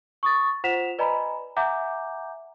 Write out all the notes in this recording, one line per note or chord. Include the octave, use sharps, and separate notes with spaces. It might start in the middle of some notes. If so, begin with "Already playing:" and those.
C#6 D#6 A6
F4 C5 F#5 B6 E7 F7
B4 D5 D#5 G#5 A#5 B5
E5 F#5 G#5 A#5 D6 G6